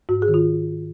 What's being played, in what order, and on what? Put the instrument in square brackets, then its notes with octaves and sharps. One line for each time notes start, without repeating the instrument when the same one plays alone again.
[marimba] G#2 F#4
G#4
D#3
F4